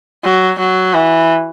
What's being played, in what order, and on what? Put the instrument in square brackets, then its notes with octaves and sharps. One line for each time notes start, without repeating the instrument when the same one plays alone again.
[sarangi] F#3
F#3
E3